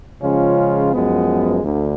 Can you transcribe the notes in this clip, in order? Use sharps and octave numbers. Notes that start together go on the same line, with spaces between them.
C#3 F3 G#3 C#4 F4
F#2 F3 G#3 B3
D2 D3